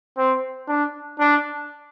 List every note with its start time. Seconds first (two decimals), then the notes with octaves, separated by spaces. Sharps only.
0.18 C4
0.68 D4
1.20 D4